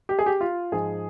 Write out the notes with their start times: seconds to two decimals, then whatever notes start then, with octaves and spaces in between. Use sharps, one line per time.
0.09 G4
0.19 G#4
0.26 G4
0.41 F4
0.72 G#2 F3 G#4